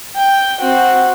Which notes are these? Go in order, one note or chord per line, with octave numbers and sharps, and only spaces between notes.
G5
C4 F#4